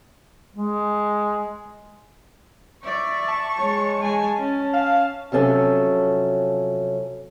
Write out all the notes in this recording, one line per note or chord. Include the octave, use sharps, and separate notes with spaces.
G#3
D5 E5 C#6
A5
G#3 C#5
G#3 G#5
C#4
F5 A5
C3 F3 F#3 C#4 A4 G#5